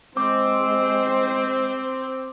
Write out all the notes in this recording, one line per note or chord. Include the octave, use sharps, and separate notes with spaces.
G#3 C4 C5 D6